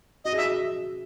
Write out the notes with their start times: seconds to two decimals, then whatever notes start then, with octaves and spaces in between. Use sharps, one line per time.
0.25 F#4 D#5
0.32 G#4
0.37 F#4 E5